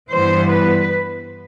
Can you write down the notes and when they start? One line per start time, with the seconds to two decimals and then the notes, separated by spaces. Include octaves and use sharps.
0.13 G2 E3 G3 B3 C5
0.52 B4